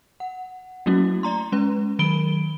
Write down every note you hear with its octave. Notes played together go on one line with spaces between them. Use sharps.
F#5
F#3 A3 A#3 C#4 E4 F#4
D5 A#5 C6
G#3 C#4 B4
D#3 F#3 A#4 B5 D7 G7